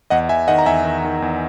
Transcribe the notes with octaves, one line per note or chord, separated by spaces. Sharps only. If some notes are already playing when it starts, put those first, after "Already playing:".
E2 D#5 F#5
E2 E5 G#5
D#3 D#5 F#5
A#5
E2 E5 G#5
D#3
D#3
E2